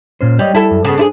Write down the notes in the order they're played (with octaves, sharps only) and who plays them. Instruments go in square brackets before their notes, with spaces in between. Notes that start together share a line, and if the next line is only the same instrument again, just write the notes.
[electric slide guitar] A#2 C#4 C5
[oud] G3 [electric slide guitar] G4 C#5 D#5
[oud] E4 A4 [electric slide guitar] A5
[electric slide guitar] F#2
[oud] C#3 B3 [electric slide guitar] A4
[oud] D4 E4 G#4